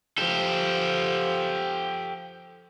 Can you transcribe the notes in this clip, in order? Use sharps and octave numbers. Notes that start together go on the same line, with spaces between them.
F3 G4 A4